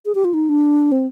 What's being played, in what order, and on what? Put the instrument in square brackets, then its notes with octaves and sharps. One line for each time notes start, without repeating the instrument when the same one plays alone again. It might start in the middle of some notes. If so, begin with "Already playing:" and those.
[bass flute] G#4
G4
F4
D#4
D4
C4